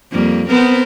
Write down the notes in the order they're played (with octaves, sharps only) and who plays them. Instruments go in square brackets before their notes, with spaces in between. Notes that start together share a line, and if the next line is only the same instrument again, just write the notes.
[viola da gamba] F2 G3 A#3
[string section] B3 [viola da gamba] C4 A#4 C5